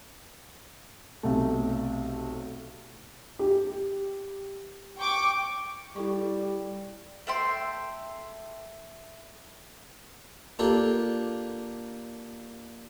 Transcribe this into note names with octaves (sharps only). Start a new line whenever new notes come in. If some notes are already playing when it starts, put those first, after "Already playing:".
B1 C3 A3
G4
G5 C#6 D6
G3 E4 A4 C#6
A3 E5 G5 C6
A#3 D4 F4 G4 A4